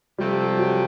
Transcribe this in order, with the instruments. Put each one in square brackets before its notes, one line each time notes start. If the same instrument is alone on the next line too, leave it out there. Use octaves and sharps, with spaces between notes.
[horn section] C3 F3 A3 C4 [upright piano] G3
[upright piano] F#3